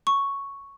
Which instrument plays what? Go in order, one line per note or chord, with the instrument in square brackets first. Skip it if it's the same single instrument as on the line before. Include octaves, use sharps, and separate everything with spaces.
[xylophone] C#6